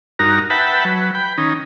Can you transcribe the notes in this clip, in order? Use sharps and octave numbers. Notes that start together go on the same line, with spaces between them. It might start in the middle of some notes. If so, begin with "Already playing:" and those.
G2 D#4 F#4 A#4 A#5
B4 E5 F#5 G5 A5 B5
F#3 B4
G5 B5
D#3 C#4 D#4